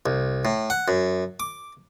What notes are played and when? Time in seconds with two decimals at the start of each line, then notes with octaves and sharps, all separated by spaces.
0.06 C2
0.45 A2
0.70 F#5
0.88 F#2
1.40 D6